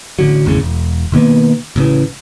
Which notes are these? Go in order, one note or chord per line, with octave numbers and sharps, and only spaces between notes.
A1 D3 F#3
G#1 E2 A2 C#3
E1
B2 D#3 A#3 B3
A1 C#3 E3